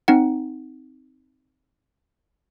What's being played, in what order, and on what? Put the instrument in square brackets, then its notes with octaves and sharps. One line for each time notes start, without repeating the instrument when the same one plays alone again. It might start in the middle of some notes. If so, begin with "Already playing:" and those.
[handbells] C4 D#4 F#5